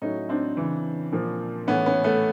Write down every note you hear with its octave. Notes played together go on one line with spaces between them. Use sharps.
A2 F#3 C#4 D#4
C4 D4
C#3 E3
A#2 F3
A2 E3 B3 C#4
B3 C#4
A3 B3